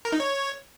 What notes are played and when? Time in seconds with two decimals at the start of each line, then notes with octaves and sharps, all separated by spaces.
0.05 A#4
0.12 D#4
0.20 C#5